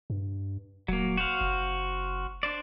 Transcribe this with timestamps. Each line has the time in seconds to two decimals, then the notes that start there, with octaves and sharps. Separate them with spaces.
0.10 G2
0.88 D#1 F#3 A#3
1.17 F#4 C5 F5
1.41 F#1
2.43 D4 C5 D5